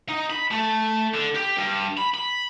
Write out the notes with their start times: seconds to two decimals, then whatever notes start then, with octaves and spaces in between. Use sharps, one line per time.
0.09 D#4
0.30 B5
0.51 A3
1.14 D3
1.35 G4
1.57 G2
1.97 B5
2.14 B5